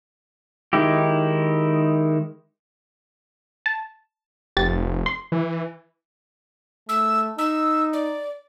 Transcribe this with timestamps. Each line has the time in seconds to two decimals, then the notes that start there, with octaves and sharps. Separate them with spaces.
0.73 D#3 G#3 D#4 E4 G4
3.66 A5
4.57 F1 G4 A6
5.06 C6
5.32 E3
6.89 A3 E6
7.38 D#4 E6
7.93 D5